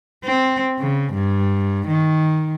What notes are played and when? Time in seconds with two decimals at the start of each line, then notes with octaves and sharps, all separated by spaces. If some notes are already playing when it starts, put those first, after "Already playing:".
0.24 C4
0.80 C#3
1.13 G2
1.88 D#3